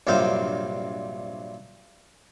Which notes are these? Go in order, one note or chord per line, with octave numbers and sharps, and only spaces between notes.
A#1 G2 C3 F#3 C5 F5